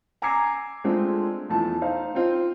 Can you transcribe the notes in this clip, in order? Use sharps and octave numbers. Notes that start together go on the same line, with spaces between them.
G#5 A#5 D6 E6 G#6 C7
G#3 A3 C4 D4 F4
E2 F3 A3 A5
D#4 C5 F5
C4 F4 C5